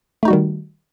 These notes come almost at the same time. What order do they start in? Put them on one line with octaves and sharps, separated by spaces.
A3 D#4 F#4 G3 D#3